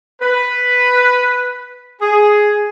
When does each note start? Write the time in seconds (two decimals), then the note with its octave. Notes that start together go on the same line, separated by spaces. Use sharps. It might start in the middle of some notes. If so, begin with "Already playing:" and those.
0.22 B4
2.01 G#4